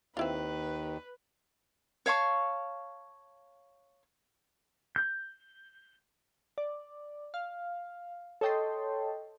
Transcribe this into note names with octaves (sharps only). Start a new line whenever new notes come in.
D#2 C4 E4 F4 B4
C#5 F5 A5 C#6
G6
D5
F5
A4 C#5 D#5 G5 A5 C6